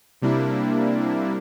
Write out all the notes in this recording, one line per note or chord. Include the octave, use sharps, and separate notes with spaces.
C3 G3 A#3 D4 E4